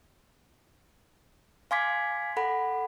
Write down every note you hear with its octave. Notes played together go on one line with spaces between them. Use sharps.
F5 G#5 C6 D6 G#6 B6
A4 F#5 B5